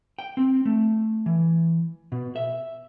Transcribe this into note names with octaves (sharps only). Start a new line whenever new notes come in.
G5
C4
A3
E3
B2
E5